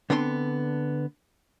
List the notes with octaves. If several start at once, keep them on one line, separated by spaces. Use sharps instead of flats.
D3 B3 C4 D4 A5 C6